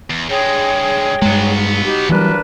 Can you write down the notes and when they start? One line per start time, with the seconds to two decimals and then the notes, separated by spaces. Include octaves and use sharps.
0.10 E2
0.29 G2 G#3 G#4 C#5 G5
1.22 G2 F#3 G#3 B3
1.85 D#4 F#4 G4
2.09 E3 F#3 G3 D4 A#4 B4